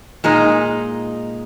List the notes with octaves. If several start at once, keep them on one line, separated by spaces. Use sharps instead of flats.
A#2 G#3 D#4